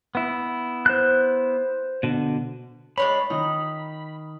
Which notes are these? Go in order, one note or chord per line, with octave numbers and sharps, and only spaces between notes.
B3 E4
C5 F#6
B2 D3
G#3 D4 C#5 B5
D#3 D#4 A#5